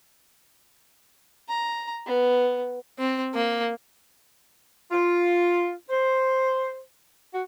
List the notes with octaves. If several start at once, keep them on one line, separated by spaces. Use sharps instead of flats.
A#5
B3
C4
A#3
F4
C5
F#4